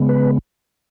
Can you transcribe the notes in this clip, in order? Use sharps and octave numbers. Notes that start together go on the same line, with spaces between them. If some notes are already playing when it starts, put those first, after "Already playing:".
Already playing: C#3 G#3 B3
B4